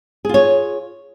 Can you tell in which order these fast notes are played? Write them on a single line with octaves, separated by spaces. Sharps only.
G#4 F4 C#5